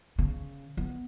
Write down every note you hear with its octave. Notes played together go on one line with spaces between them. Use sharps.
C#3
B3